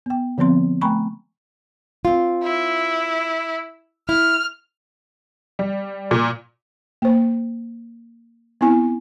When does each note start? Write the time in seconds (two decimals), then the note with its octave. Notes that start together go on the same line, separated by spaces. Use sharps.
0.06 B3 G5
0.38 D3 F3 B3 C4 C6
0.81 A3 G5 G#5 A#5 B5 C#6
2.05 C4 F4
2.43 E4
4.09 E4 F6
5.59 G3
6.11 A#2
7.02 A#3 C5
8.61 B3 C4 E4 G#5